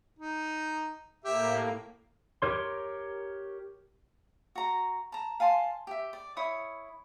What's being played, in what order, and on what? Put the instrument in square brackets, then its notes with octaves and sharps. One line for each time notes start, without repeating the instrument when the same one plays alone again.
[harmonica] D#4
[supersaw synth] A2 A#3 [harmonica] G4 E5
[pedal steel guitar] G4 A#4 C#5 C6
[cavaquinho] F#4 A#5
A5 A#5
F5 G#5 A5 C6
G4 E5
D5
E4 C#5 D#6